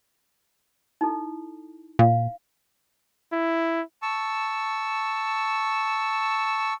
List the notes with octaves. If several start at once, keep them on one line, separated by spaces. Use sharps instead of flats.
D#4 E4 A4
A#2 F5
E4
A5 C#6 E6